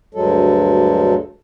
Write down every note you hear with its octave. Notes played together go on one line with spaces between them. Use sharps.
D2 G2 F#3 G#3 A4